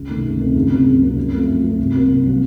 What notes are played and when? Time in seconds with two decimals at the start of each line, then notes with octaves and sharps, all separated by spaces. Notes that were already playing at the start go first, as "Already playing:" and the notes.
Already playing: C#2
0.09 C3 D#3 A3 C4
0.24 C#2
0.39 C3 D#3 A3 C4
0.55 C#2
0.70 C3 F#3 A#3
0.86 C#2
1.02 C3 F#3 A#3
1.17 F#2
1.32 F3 A3 C4
1.47 F#2
1.63 F3 A3 C4
1.78 C2
1.94 C3 F#3 A#3
2.09 C2
2.25 C3 F#3 A#3